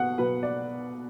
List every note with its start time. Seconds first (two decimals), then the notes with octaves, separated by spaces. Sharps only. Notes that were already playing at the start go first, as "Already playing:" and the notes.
Already playing: B2 F#5
0.18 B2 F#3 B4
0.43 D5